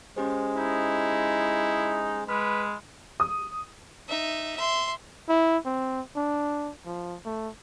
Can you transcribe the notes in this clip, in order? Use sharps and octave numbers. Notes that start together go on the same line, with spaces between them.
G#3 C#4 G4 C5
D#4 E4
G#3 B4 B5 F6
D#6
D#4 E5
E5 C6
E4
C4
D4
F3
A3